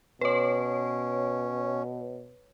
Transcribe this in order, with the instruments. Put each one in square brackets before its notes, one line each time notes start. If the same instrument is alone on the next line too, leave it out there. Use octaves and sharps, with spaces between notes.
[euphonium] B2 [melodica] C#4 [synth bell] B4 C#5